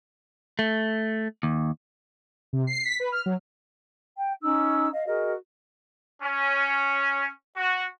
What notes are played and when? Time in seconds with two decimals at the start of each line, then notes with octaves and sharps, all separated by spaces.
0.59 A3
1.43 D#2
2.53 C3
2.67 C7
2.85 B6
3.00 B4
3.12 F6
3.26 F#3
4.17 G5
4.42 C#4 D#4 E6
4.92 D#5 F5
5.06 F#4 G#4 A#4 D#5
6.22 C#4
7.57 F#4